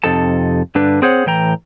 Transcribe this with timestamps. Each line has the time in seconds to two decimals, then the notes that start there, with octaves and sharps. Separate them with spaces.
0.04 F2 C3 D#4 A4 A5
0.75 G2 D3 D4 B4
1.02 C4 G#4 C5 C#5 F#5
1.26 A2 E3 G5 A#5